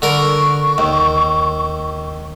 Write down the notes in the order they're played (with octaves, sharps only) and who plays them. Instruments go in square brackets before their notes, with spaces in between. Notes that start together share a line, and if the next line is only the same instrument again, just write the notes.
[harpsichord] D3 A#4 B5 [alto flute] C#6
[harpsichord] D#2